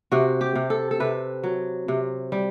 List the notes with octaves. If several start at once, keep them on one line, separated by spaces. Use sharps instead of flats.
C3 F#4
G4
C3
A4
A4
C3 B4
F#3
C3
G3